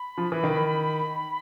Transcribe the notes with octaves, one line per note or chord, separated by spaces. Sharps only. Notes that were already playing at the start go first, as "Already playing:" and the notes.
Already playing: B5
F3
E3
D#3